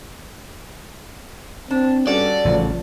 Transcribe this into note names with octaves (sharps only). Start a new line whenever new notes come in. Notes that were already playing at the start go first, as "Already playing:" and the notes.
C4 D4
G2 C#4 F#4 A4 D5
A1 C#3 F3